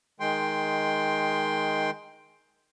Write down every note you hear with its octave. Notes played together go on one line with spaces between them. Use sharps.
D#3 G#3 G5 C6